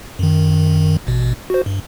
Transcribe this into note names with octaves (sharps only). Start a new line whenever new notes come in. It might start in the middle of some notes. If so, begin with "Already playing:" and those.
F#2 D#3
A1 B2
F#4 C5
G2